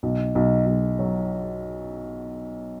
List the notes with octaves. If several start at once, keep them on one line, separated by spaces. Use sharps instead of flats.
B1
B1
B1
F#3